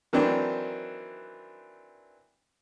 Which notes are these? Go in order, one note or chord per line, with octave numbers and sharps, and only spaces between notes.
D#3 E3 F#3 C4 D4